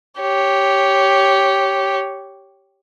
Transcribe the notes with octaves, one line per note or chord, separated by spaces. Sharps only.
G4 C#5